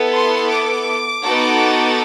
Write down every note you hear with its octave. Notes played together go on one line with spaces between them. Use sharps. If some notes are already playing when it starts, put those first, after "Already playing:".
Already playing: B3 E4 A4
C6
D6
B3 D#4 F#4 A4